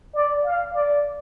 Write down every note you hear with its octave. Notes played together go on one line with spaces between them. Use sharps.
D5
F5
D5